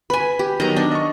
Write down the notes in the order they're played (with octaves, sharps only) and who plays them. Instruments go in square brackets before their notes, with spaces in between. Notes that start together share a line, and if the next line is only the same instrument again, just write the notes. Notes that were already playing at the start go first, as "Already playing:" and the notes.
[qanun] B4 G#5 [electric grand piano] B5 D#7
[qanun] G4
[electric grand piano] D#3 F#3 B3 [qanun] D#5 A#5
[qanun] D4
[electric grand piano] D#5 C#6